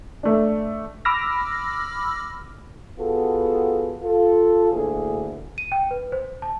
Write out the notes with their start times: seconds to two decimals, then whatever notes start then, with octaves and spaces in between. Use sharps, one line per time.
0.23 A3 D4
1.05 B5 D6 E6 F6 A#6
2.99 B3 F4 F#4 G#4 A4
4.03 F4 A4
4.72 D2 A2 D3 A#3 E4 G#4
5.58 D#7
5.72 G5
5.91 B4
6.12 C5
6.42 A5